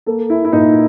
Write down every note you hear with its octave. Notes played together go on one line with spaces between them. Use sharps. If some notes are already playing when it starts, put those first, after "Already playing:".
A#3 A4
E4
E4
A#2 D#4